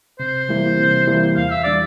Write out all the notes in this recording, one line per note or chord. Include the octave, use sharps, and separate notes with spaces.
C3 C5
E3 G3 A#3 E4
C3
E3 G3 A#3 E4
E2 F5
E5
E3 G3 D4 D5